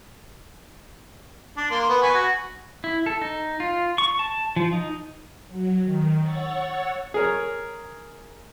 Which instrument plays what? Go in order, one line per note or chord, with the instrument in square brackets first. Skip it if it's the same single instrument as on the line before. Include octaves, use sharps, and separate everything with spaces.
[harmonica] D4
A#3 C6
B3
B4 G#5 C#6
F#4
[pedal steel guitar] E4
A4
D#4
F4
C#6
A5
F3
D#4
[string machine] F#3
D#3
C#5 F#5 C#6 E6 A6
[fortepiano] G#4 A#4 C#5